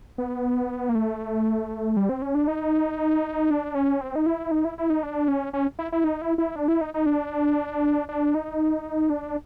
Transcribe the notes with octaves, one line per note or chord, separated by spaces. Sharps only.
B3
A#3
A3
G3
C4
C#4
D4
D#4
D4
C#4
C4
D#4
E4
D#4
E4
E4
D#4
D4
C#4
C#4
E4
E4
D#4
E4
E4
D4
E4
D#4
D#4
D4
D4
D#4
D4